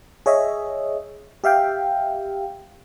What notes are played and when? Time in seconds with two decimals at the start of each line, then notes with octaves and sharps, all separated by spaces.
0.26 G#4 C#5 D#5 E5
1.44 G4 E5 F5 G5